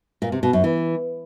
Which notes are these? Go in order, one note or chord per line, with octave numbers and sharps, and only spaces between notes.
A#2
C3
B2
F#2
E3